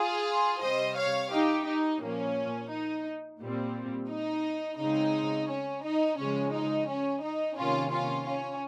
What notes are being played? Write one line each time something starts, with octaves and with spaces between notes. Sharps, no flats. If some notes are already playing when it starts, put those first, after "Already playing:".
Already playing: F4 G#4
C3 G3 C4 C5 D#5
C#5 F5
D#4 G4
D#4
A#2 F3 A#3 C#4
D#4
A#2 G3 C4
D#4
C#3 G#3 C4 D#4
C#4
D#4
C#3 F3 G#3 C#4
D#4
C#4
D#4
C3 D#3 A#3 C#4 F4
C#4 F4
C#4